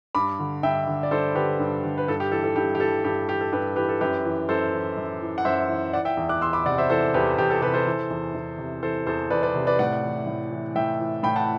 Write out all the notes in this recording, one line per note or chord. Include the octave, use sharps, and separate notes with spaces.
G2 B5 D6
D3
G2 E5 G5
D3
D5
G2 A4 C5
D3 G4 B4
G2
D3
B4
G2 A4
G4
E3 A4
A4
G2 G4
G4
E3 A4
G2 G4
E3 G4
A4
G2 G4 B4
E3 G4 B4
A4
F#2 G4 B4
E3
F#2 A4 C5
E3
F#2
E3
F#5
F#2 C5 E5
E3
E3 D5 F#5
E5 G5
E2
D6 F#6
E2 C6 E6
B5 D6
C3 D5 F#5
C5 E5
E3 A4 C5
E2 G4 B4
E2 G4
A4
C3 G4 B4
A4 C5
E3
E2
E2
C3
E3 A4 C5
E2 A4 C5
E2 B4 D5
B4 D5
C3
B4 D5
A2 D5 F#5
E3
A2
E3
A2 E5 G5
E3
A2 G5 B5
F#5 A5